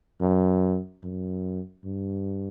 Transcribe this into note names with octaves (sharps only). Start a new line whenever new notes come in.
F#2
F#2
G2